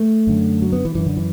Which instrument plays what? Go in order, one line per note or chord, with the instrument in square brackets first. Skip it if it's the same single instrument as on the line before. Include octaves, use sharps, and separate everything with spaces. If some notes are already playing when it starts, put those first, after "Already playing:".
Already playing: [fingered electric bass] A3
F#2 D3
F#3
B3
E3
F#2 D3 E3
D3
E3